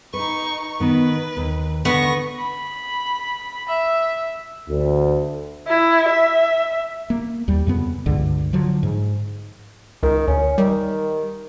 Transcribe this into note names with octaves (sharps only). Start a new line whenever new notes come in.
D#4 B4 C#6
D#3 B3 B4
D#2
D3 B3 C#6 A#6
B5
E5
D2
E4
E5
A#3
D#2 G3
F2 C#3 B3
C#2 G2 D3
D3 F3 F#3
G#2
C#2 D#3
D2 C#4
D#3 G3